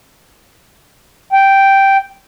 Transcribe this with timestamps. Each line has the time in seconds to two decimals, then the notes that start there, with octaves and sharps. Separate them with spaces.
1.33 G5